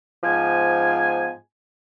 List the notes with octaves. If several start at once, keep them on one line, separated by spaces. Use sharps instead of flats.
G#2 F3 B3 G#5